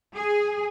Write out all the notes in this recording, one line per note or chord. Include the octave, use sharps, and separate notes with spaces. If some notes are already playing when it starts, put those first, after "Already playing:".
G#4